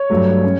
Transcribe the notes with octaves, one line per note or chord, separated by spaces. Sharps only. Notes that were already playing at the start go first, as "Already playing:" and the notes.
Already playing: C#5
G2 F#3 A3
G3 C#4